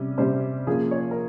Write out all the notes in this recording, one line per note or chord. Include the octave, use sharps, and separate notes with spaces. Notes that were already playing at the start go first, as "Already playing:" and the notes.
Already playing: C3 G3 C#4
C3 G3 C#4 C5
F3 A#3 C#4 G#4
C#5
A#4